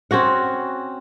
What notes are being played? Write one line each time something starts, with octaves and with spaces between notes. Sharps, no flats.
C4 C#4 F#4 F#5